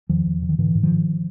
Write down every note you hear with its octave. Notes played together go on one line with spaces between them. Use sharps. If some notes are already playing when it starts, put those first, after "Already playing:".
E2 D#3 F3
E2
C#3
D#3
G#2 D3 E3
G#2
D#3 F3
G#2